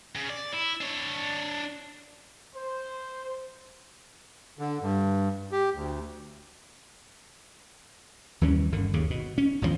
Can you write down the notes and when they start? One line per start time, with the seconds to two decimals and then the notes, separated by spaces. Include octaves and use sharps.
0.16 C#3
0.30 D5
0.54 E4
0.81 D4 C#5
2.55 C5
4.59 D3
4.82 G2
5.52 G4
5.74 D2
8.41 D#2 E3 G3 C#4
8.72 G1 D3 D#3
8.94 D#2 C#3
9.10 B2
9.38 C#4
9.62 G#1 E2 C3 F3